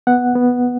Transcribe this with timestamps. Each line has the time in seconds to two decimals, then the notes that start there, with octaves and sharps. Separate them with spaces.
0.07 B3 F#5
0.35 B3